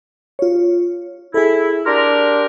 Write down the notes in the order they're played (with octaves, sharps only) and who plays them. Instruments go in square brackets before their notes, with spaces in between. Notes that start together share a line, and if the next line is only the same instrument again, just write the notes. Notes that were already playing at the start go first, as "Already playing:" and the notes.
[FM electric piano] F4 C#5
[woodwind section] E4 [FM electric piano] G#4 A4
[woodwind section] D4 G4 A#4 [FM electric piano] C6